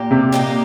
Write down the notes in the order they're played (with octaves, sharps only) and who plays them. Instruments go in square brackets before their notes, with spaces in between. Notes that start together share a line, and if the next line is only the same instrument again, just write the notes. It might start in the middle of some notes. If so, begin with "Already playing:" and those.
Already playing: [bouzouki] A#2 A#3 G4
[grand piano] C3
[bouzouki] A#2 A#3 D#4 G4